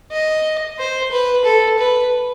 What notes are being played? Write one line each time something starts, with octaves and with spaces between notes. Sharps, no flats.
D#5
C5
B4
A4
B4